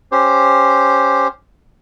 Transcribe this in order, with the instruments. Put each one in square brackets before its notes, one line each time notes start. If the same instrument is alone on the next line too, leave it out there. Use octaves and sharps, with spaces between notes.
[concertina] C#4 G4 C5